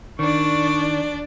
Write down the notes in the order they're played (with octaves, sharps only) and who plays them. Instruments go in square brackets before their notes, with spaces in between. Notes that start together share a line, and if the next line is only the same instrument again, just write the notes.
[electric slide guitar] D#3 [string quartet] D4 D5 [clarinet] C#6